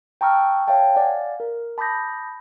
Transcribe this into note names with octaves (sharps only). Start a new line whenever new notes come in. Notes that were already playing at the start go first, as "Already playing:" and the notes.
G5 A5 A#5 C#6 E6 F6
C#5 E5 F5 G5 A5
D5 F5 F#5 G#5
A#4
A5 B5 D6 D#6 G6 A#6